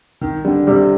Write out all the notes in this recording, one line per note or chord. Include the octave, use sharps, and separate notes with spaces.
C2 D#3
D3 G3
C3 G3